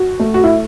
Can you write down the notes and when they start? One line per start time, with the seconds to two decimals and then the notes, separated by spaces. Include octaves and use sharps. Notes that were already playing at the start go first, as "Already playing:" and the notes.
Already playing: F#4
0.20 A3
0.34 F#4
0.44 E4